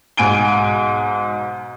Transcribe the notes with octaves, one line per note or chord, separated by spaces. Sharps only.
B1 G#2 G#5 D7 G7